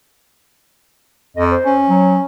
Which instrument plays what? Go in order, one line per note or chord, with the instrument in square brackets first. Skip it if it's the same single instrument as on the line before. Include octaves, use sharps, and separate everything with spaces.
[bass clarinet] F2 [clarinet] D#5
[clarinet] C5
[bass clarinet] C#4
[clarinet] F#3